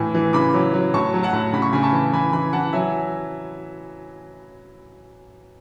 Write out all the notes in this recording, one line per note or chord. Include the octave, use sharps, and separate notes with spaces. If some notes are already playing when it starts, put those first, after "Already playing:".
Already playing: A2 E3 G#5
E3
C#3 B5 D6
F#3
F#3
A2 A5 C#6
F#3
F#5 A5
A2
C#3 B5
C#6
C#3 G#5 B5
A5 C#6
E3
E3 G#5 B5
E3 G#5 B5
E3 F#5 A5
F#3 E5 G#5